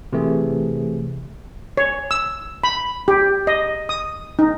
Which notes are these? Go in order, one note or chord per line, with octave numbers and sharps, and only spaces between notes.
C3 E3 A3 G#4
C#5
E6
B5
G4
D#5
D#6
D#4